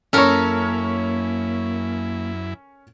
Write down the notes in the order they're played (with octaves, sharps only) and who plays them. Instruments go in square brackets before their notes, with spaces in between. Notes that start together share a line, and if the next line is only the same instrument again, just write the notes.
[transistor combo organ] F#2 E4 [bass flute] A#3 [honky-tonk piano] C#4 C#5 [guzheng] A4 A#4